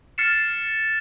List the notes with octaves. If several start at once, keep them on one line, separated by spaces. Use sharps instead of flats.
F6 A6 C7 C#7 E7